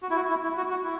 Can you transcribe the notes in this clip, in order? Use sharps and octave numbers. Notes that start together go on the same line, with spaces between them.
F#4
E4
F#4
E4
E4
F#4
F#4
E4